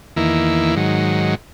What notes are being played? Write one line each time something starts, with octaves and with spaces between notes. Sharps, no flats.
E2 D#3 A#3 E4
G#2 D#3 F#3